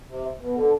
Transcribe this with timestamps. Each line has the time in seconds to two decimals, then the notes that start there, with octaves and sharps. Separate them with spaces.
0.09 C3
0.39 B2
0.55 D3